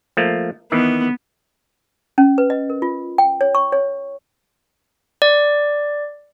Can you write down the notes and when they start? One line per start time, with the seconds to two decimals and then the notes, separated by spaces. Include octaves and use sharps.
0.17 F3 A3 A#3
0.72 D#3 E3 B3
2.18 C#4
2.38 B4
2.50 D#5
2.70 A#4
2.82 F4
3.18 G5
3.41 C#5
3.55 C#6
3.72 C#5
5.22 D5